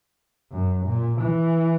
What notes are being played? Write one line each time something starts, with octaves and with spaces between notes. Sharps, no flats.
F#2
A#2
E3